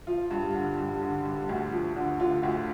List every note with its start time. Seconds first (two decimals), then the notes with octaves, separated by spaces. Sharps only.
0.07 F3 F4
0.31 G2
0.54 D3
0.78 G2
1.02 D3
1.25 G2
1.49 D2
1.72 F3
1.96 D3
2.20 D3 F4
2.43 D2